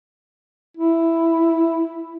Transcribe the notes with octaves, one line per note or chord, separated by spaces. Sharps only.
E4